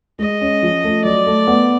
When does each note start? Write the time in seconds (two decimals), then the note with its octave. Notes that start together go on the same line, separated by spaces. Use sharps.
0.19 G#3 D#5
0.41 C#4
0.63 F3
0.84 A3
1.04 F#3 D5
1.26 A3
1.47 B3